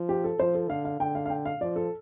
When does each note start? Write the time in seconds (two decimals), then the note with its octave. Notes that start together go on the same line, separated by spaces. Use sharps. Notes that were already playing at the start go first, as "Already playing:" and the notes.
Already playing: F3
0.09 G4
0.24 A4
0.39 F3 C5
0.55 A4
0.69 D3 F5
0.85 F5
1.00 D3 G5
1.15 F5
1.26 F5
1.30 G5
1.45 F5
1.61 F3 D5
1.76 A4